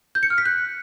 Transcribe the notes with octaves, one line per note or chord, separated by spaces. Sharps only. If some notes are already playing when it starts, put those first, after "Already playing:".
G6
C#7
F6
B6
F#6